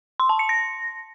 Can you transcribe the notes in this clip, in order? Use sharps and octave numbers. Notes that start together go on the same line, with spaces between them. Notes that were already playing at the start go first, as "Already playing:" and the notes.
C6
A5
C#7
A#6